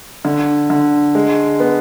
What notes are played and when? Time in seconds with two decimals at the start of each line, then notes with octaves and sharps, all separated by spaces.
0.25 D3
0.70 D3
1.15 G#3
1.60 B3